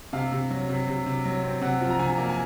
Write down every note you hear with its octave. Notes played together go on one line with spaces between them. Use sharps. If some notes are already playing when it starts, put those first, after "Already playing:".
C3 F5
C3
F#3
C3
C3
C3
F#3
C4
C3 F#5
F3
A#5
C3 G#5
A#3
G#5